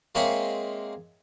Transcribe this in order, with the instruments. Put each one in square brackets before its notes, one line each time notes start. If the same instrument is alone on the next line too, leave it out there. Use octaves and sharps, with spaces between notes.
[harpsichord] G#3 A#3 C4 G#4 C#5 E5